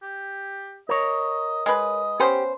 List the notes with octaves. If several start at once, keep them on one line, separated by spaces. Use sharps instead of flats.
G4
A#4 C#5 D#5
G#3 B4 D#5
B3 C#4 G4 C5